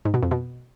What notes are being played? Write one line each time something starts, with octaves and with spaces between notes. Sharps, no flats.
G#2
B2
F2
B2